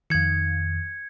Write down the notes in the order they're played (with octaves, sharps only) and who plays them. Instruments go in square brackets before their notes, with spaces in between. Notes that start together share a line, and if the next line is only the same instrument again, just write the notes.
[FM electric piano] F2 D#3 [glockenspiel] G#6 C#7